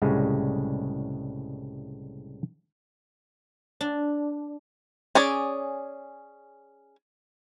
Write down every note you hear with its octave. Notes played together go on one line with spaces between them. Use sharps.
C2 A2 C#3 G3 G#3
D4
C#4 G#4 D5